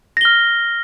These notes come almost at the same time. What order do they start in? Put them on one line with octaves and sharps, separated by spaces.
A#6 G7 F6